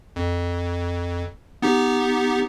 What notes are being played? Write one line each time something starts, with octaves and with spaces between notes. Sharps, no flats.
F2
B3 D#4 G4